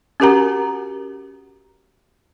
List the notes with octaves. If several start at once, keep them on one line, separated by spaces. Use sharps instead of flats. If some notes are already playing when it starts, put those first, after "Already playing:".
C#4 F#4 G4 A#4 F#5 A#5